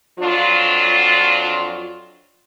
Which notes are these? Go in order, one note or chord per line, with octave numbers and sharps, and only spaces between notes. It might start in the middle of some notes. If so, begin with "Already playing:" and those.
F2 F#3 D4 F4